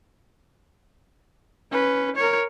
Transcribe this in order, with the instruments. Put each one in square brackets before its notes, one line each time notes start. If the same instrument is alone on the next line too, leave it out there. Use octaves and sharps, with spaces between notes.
[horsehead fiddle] C#4 B4
A#4 C#5